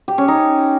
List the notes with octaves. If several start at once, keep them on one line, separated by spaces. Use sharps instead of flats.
G4
C#4
D#4